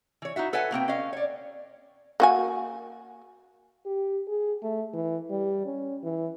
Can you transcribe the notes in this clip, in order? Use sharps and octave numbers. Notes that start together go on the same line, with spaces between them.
E3 C#5
D#4 E4 F#4 E5
A4 B4 C#5 E5 F#5 G#5
B2 A#3 C4 G5
C#4 D#5 F5
C#5 D5
A#3 F#4 G#5
G4
G#4
A3
E3
G3
C#4
E3